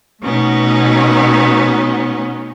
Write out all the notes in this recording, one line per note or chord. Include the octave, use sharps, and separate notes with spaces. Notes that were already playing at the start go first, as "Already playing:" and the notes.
B2 A3 B3 C#4 D#4 F#4